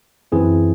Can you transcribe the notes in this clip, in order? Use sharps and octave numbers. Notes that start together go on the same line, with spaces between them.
F#2 E3 C4 E4 G#4